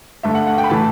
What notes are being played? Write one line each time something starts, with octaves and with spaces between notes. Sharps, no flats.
G2 D3 A3 E5
F#5
F#5
G5
B5
A2 E3 A3 A5